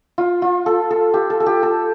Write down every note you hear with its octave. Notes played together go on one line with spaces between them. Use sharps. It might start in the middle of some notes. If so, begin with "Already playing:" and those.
F4
F4
A4
A4
G4
A4
A4
G4
A4